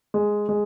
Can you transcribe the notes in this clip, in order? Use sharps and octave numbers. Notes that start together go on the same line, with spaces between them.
G#3
G#3